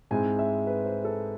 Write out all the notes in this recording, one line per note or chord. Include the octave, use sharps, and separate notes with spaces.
G#2 G#3 C4 E4 G#5
E5
B4
C5
A4